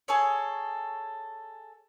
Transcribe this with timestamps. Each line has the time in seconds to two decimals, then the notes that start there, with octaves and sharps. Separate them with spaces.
0.08 G#4 A4 C#5